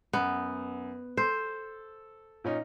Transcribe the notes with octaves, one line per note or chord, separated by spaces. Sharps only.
F#2 B3
A4 C5
A#2 C#4 D#4